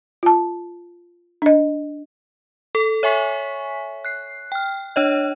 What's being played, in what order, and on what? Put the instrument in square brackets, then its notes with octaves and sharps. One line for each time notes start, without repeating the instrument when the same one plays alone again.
[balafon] F4 A5
D4 D#5
[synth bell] A4
C#5 E5 G#5 C#6 B6
F#6 C7
G5 F6
D4 C#5 D#5